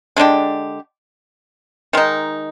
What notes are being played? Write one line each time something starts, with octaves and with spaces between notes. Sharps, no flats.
D3 G#3 D4 G4
D#3 G#3 D#4